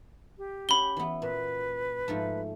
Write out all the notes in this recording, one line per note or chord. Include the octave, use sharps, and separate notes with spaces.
G4
C#4 F#4 B5 G7
E3 B3
A#2 B4
G#2 F3 A3